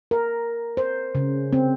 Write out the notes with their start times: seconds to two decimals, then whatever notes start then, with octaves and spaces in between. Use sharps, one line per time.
0.11 A#4
0.77 C5
1.15 C#3
1.53 C4